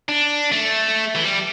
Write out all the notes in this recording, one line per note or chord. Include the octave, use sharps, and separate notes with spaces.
D4
A3
E3
G3